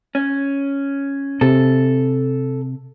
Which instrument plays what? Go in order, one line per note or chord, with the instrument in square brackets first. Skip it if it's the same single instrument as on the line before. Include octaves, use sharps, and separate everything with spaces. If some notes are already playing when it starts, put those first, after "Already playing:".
[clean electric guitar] C#4
[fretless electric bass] C3 [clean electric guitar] A4